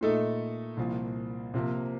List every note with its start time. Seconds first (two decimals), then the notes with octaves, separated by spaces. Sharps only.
0.01 A#2 A3 D#4 A4
0.77 C2 A#2 F3
1.54 C3 F3 A#3